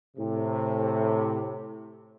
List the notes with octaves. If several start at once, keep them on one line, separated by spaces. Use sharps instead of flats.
A2 C3